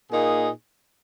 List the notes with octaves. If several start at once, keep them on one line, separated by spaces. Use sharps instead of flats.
A#2 A#3 D#4 G#4